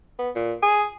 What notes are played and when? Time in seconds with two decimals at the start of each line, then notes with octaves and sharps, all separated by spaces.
0.19 B3
0.35 A#2
0.63 G#4